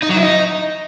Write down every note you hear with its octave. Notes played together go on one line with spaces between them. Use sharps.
D#4
F#3
E4
D#4